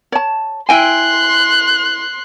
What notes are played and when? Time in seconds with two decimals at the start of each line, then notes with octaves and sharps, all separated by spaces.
0.12 C#5 A5
0.69 E4 G5 G#5 C6 F#6